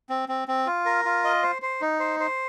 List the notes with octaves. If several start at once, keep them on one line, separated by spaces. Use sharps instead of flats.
C4
C4
C4
F4
A#4
F4
D#5
C5
C5
D#4
C5
C5